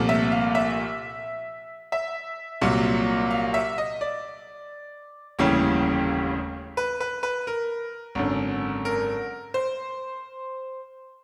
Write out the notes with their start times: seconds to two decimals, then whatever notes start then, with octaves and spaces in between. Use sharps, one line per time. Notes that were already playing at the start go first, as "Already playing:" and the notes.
Already playing: C2 A#2 F3 A3
0.09 E5
0.32 F5
0.55 E5
1.92 E5
2.61 C2 A#2 F#3
3.31 F5
3.54 E5
3.78 D#5
4.01 D5
5.39 F1 D#2 C#3 E3 G3 C#5
6.77 B4
7.00 B4
7.23 B4
7.47 A#4
8.15 G#1 F#2 D3
8.85 A#4
9.54 C5